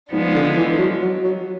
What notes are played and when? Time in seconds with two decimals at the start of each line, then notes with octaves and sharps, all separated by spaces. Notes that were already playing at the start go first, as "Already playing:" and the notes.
0.12 G#2 F3 G#3 B3 D4
0.34 D3
0.56 E3
0.79 F#3
1.01 F#3
1.23 F#3